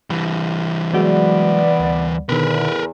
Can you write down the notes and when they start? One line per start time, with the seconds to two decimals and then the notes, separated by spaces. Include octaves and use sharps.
0.10 E3 G3
0.93 F#3 G#3 B3 F#4 D5
1.80 D2
2.29 E2 B2 D3 D#3 A#4 B4